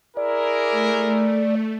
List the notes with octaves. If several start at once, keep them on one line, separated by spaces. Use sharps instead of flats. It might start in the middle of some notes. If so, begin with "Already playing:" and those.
E4 G#4 A#4 D5
A3